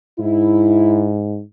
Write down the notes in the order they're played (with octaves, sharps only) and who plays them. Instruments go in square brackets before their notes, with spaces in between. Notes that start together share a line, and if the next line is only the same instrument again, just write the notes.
[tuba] G#2 [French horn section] E4